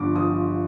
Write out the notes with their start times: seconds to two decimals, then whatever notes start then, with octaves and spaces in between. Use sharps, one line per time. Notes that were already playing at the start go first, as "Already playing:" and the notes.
Already playing: G1 G2 F3 D6
0.15 F3 D#6